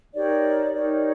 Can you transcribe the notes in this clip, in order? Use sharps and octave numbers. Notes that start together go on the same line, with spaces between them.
D#4 G4 A#4 C#5 D5
D#4 G4 A#4 C#5 D5